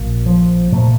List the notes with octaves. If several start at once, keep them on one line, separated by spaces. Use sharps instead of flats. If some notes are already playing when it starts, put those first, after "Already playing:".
Already playing: A#1 A#2
F3
A#2 A3